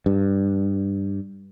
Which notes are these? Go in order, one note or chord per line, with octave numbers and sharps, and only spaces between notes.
G2